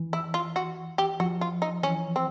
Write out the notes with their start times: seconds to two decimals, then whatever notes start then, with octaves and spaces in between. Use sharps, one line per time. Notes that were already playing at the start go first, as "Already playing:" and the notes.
Already playing: E3
0.13 E4
0.34 F4
0.56 F#4
0.98 G4
1.20 F3 F#4
1.41 F4
1.62 D#4
1.83 E3 C#4
2.16 C4